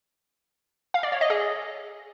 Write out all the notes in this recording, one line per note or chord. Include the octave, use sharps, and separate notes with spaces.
F5
D5
C#5
D#5
G#4